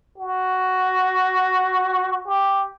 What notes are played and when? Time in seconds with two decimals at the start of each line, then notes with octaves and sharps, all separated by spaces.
0.18 F#4
2.26 G4